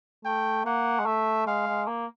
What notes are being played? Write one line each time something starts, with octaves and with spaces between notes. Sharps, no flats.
A3 G5
A#3 F#5
G#3
A3 E5
G#3 F5
G#3
A#3